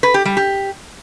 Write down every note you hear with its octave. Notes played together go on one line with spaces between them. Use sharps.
B4
G4
G3
G4